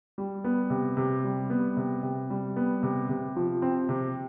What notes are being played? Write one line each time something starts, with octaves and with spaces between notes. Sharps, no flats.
G3
B3
C3
C3
G3
B3
C3
C3
G3
B3
C3
C3
F3
C4
C3